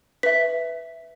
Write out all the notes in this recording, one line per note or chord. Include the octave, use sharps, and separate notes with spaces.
B4 E5 B6